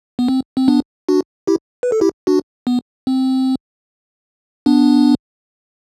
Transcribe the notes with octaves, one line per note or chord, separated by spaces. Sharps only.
B3
C4
C4
B3 D4
D4 F#4
E4 G4
B4
A4
E4 G4
D4 F#4
B3
C4
B3 D4